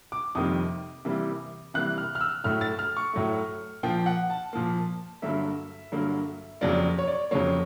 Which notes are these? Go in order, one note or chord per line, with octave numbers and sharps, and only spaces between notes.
D6
F2 C3 D#3 G3 A#3 D#6
C3 E3 G3 A#3
C3 E3 G3 A#3 F#6
F6
F6
E6
A2 F#3 A3 F6
A6
F6
C#6
A2 F#3 A3
A#2 F3 A#3 G5
F#5
A5
A#2 F3 A#3
G2 D3 F#3 A#3 E5
G2 D3 F#3 A#3
F2 C#3 F#3 A#3 D5
C#5
D5
F2 C#3 F#3 A#3 C#5